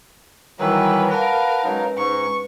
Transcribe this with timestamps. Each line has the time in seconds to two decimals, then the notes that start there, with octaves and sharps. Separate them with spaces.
0.59 D#3 E3 F#3 G3 B4 A#5 E6
1.10 A#4 B4 F5 F#5 A5
1.64 F#3 G#3 C#4 D#4 B4
1.97 G#2 C#6